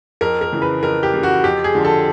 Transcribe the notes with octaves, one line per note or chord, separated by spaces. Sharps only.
F2 A#4
A#4
C#3 E3
B4
F2 A#4
G4
C#3 E3
F#4
F2 G4
G#4
D3 F3
A4